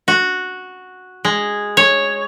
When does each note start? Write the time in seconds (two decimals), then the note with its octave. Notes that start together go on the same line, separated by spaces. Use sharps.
0.08 F#4
1.25 G#3
1.77 C#5